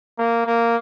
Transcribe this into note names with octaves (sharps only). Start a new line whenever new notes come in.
A#3
A#3